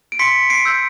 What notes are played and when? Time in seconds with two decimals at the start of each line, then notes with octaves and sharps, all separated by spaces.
0.12 D7
0.19 C6 B6 C#7
0.50 C7 D7
0.65 E6 G6